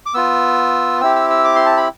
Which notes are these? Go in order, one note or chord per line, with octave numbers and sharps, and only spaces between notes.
D6
B3 F4 E6
C4 E4 G4 E6
E6
E6
D6
C6
A5
B5